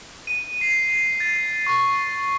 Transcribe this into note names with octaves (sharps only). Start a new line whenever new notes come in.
D#7
C7
A6
C#6